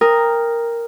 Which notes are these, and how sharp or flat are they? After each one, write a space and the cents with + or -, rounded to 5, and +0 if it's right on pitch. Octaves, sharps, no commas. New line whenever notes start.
A#4 +0 G5 +25 D#6 +0